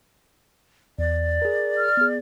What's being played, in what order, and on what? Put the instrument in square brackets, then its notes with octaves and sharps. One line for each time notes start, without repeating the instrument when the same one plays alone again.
[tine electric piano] E2 [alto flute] D5
[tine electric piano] G#4 A#4
[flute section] F6
[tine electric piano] B3 G#4